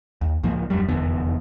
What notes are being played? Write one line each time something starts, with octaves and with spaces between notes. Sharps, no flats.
D#2
C#2 A2 F3 A#3
D#1 F#2 G3
F1 E2 D3 B3